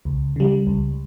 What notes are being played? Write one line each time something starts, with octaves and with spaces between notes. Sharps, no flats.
C#2
C#3 G3
C#2